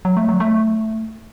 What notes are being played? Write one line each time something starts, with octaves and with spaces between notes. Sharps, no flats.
F#3
A3
F#3
A3